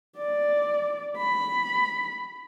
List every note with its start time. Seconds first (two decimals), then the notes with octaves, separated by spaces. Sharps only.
0.17 D5
1.17 B5